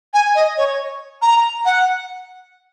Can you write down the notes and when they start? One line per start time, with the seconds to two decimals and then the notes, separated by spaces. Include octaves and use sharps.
0.14 G#5
0.35 D#5
0.57 C#5
1.22 A#5
1.65 F#5